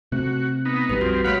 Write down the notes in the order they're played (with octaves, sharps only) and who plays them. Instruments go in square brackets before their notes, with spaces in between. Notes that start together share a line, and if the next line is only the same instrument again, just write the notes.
[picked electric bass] C3 A3 [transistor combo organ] F#4
[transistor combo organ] B3 D#4
[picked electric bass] A#1 G3 [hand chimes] B4
[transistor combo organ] F2 C4 [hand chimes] F#4
[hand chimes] A3 A#3 C#5 [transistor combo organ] F5 F#5 B5